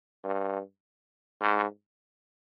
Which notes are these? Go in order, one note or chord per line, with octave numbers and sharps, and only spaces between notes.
G2
G#2